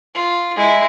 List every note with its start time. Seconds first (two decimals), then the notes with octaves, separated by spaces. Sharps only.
0.14 F4
0.56 G#3 E4